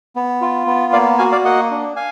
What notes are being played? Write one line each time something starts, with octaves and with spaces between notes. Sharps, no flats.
B3
F4
B3
A#3 D5 F5
F#4 F5 G#5
D5 F5
A#3 D#5 F#5
D4
F5 G#5